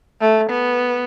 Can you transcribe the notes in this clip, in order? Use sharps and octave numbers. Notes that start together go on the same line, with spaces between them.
A3
B3